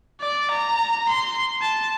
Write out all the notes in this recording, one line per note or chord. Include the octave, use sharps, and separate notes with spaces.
D5
A#5
C6
A5